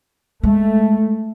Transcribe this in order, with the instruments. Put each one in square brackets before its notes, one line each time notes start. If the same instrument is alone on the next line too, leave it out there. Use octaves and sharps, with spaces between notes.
[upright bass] G#3 [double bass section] A3